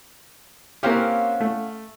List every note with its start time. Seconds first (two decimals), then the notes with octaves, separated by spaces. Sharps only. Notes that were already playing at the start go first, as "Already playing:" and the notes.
0.83 A#3 C4 C#4 G4 F5 F#5
1.40 A3